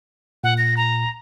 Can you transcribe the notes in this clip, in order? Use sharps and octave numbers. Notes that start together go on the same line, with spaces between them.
A#2 F#5
A#6
A#5